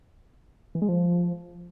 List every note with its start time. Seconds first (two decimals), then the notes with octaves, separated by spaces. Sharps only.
0.75 E3
0.82 G#3
0.89 F3